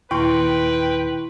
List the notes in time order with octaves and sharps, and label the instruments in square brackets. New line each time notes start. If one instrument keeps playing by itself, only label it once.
[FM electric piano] D#2 A#2 D#3 [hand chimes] E4 C6 C#6 [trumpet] B4 [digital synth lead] G5